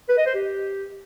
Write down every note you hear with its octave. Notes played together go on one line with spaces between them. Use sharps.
B4
D#5
C5
G4